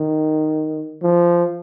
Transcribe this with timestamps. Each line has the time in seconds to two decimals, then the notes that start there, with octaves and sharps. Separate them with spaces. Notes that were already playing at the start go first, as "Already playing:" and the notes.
Already playing: D#3
1.02 F3